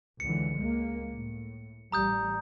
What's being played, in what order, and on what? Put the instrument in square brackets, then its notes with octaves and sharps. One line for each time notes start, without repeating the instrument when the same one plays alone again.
[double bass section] C#2 D3 E3 [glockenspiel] C#7
[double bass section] C#2 G#3 A#3
A2
[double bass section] A1 G3 [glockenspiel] A#5 D#6 G6